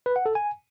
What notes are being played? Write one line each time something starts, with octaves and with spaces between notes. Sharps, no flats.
B4
F#5
A4
G#5